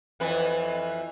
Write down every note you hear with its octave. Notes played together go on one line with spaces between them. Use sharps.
F2 E3 B4